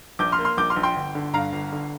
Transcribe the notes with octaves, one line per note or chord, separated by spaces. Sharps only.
A#1 D6 G6
C6 F6
A#3
C6 F6
A#1 D6 G6
C6 F6
A#1
G5 C6
G1
D3
G2 F5 A#5
G1
D3